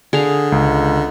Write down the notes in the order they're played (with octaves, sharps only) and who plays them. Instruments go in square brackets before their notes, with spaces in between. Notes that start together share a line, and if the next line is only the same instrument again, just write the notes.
[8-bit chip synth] D3 [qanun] G#4 F5
[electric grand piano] C#2